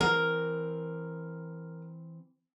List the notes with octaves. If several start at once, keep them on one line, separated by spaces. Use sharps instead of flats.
E3 C4 A#4